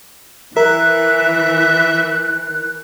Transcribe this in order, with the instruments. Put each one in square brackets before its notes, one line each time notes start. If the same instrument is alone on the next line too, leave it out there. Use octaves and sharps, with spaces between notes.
[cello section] E3 [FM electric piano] A#4 [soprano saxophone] E5 [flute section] F#6